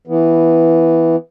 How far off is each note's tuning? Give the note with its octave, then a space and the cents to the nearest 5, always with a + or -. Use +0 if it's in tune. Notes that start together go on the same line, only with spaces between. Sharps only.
E3 +0 B3 +0